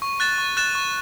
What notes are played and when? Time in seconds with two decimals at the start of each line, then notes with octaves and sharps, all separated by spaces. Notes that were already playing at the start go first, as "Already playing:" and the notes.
0.02 C#6
0.20 F#6 A6 E7
0.38 C#6
0.57 F#6 A6 E7
0.75 C#6